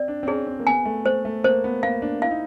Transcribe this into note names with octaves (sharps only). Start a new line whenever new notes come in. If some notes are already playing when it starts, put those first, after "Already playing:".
Already playing: C4 D5
D4
C4
C#4 G#4
C4
A#3
B3 G#5
A3
A3 C5
A3
A#3 C5
B3
A#3 F5
D4
E4 F5
D#4